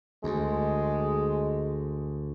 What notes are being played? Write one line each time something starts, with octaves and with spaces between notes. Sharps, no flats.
D2 G#3